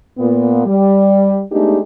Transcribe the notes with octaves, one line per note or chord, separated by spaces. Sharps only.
A#2 B3
G3
G#3 A3 B3 D4 D#4 G4